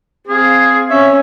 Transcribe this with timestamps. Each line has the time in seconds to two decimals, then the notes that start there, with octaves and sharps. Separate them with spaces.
0.28 C4 G#4 F5
0.90 C#4 C#5 E5